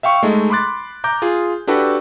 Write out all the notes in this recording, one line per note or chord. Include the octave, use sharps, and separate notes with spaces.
E5 F5 G5 C#6
G#3 A3 D#4
B5 C6 D6 F#6 A6
A#5 D6 G6
F4 G#4
D4 E4 F#4 G4 A4 B4